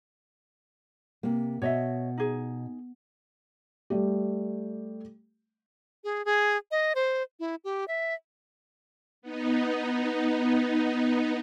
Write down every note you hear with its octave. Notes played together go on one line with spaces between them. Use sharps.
C3 A#3
B2 C#5 D#5 E5
D#4 G#4
G3 A3 G4
G#4
G#4
D#5
C5
E4
G4
E5
B3 D#4